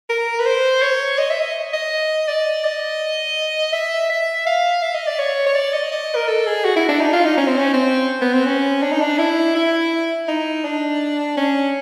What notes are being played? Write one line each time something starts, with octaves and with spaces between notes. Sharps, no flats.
A#4
B4
C5
C#5
D#5
E5
D#5
D#5
D5
D#5
E5
E5
F5
E5
D#5
D5
C#5
C#5
D5
D#5
D#5
A#4
A4
G#4
F#4
E4
D4
D#4
F4
D#4
C#4
C4
C#4
C4
B3
C4
C#4
D4
D#4
D4
E4
E4
D#4
D4
C#4